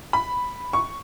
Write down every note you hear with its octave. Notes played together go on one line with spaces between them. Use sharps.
B5
C#6